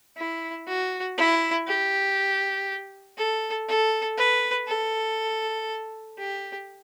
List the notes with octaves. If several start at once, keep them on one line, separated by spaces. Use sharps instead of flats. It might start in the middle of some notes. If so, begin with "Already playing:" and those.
E4
F#4
E4
G4
A4
A4
B4
A4
G4